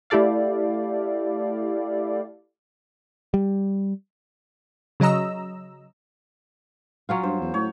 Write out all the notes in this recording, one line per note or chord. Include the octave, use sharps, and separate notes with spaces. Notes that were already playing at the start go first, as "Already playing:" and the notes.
A3 E4 G4 A4 D5 F5
G3
C#3 F#3 D#5 A#5 E6
F#3 C#4 F4
G2 C5
E2
A2 C#5